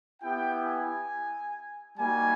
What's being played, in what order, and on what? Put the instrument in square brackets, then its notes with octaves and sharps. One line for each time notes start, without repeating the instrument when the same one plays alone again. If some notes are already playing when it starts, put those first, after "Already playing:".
[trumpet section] B3 E4 G4 G5
G#5
G3 A#3 D#4 F#4 G#5